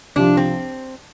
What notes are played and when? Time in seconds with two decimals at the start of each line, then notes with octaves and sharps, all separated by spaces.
0.16 C2 C3 F3 D4
0.37 C4